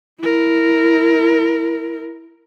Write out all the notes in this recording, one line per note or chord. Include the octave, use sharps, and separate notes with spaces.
E4 A#4